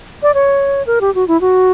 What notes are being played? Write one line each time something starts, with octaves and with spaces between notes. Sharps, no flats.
D5
C#5
A#4
G4
F#4
E4
F#4